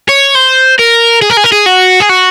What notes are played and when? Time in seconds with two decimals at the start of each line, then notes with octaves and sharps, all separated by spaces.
0.09 C#5
0.35 C5
0.79 A#4
1.22 G#4
1.30 A#4
1.37 G#4
1.44 A#4
1.52 G#4
1.66 F#4
2.00 G#4
2.09 F#4